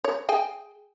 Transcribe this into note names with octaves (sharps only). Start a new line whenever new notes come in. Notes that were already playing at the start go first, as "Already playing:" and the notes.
C#5
G#4 G5 G#5